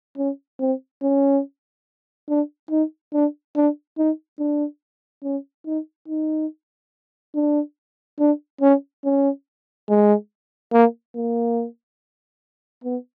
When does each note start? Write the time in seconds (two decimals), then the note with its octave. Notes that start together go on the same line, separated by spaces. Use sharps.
0.17 C#4
0.60 C4
1.03 C#4
2.29 D4
2.70 D#4
3.13 D4
3.55 D4
3.98 D#4
4.39 D4
5.24 C#4
5.66 D#4
6.08 D#4
7.35 D4
8.19 D4
8.61 C#4
9.04 C#4
9.89 G#3
10.72 A#3
11.15 A#3
12.84 B3